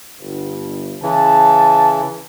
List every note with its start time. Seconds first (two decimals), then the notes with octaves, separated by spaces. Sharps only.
0.19 G1 G2
1.03 C#3 E3 A5